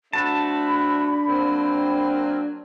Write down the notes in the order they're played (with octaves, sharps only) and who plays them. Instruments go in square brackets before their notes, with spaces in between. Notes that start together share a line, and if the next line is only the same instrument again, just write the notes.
[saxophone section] A3 C4 F#4 [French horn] D4 [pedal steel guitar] A5 [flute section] B5
[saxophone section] F#3 A#3 C4